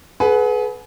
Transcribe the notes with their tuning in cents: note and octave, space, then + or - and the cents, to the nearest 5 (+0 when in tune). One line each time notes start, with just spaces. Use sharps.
G#4 +40 B4 +0 F#5 +0